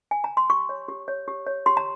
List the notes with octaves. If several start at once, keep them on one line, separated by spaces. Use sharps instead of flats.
G#5
A#5
C6
G4 C#6
C#5
G4
C#5
G4
C#5
G4 C6
A#5